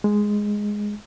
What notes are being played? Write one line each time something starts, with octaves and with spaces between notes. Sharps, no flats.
G#3